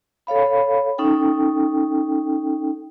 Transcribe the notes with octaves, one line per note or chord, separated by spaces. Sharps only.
A4 C#5 F5 B5
C#4 D#4 A4 G5